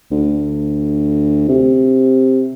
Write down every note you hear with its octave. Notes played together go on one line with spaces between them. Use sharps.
D2
C3